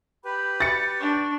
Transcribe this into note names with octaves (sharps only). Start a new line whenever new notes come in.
G4 B4 B5
A6 C#7
D4 C#6